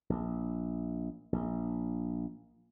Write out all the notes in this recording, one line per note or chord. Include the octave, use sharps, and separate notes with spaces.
A#1
A#1